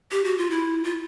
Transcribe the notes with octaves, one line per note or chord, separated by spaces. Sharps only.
G4
F#4
F4
E4
F4